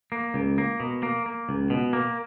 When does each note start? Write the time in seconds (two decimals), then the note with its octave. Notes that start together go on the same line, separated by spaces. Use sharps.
0.12 A#3
0.34 C#2
0.58 A#3
0.80 B2
1.03 A#3
1.26 A#3
1.49 C#2
1.70 B2
1.93 A#3